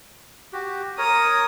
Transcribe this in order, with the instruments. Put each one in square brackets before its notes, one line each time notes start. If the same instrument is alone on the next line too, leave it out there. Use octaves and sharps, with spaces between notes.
[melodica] F#4 G4
[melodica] A#4 C#5 A#5 [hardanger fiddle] D#6